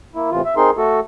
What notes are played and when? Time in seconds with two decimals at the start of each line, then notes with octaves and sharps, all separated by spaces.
0.15 A#3 E4
0.31 A2 C3 E3 F4
0.45 E5
0.56 C4 D#4 G#4 A#4 C6
0.77 A3 F#4 A4